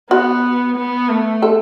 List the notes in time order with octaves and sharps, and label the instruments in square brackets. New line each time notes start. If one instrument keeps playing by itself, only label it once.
[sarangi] B3 [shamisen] F#4
[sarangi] B3
A3
[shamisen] A4